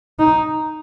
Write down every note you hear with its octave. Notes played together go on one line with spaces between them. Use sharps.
D#4